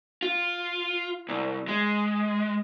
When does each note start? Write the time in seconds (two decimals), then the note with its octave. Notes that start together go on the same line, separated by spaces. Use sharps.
0.23 F4
1.29 C2
1.68 G#3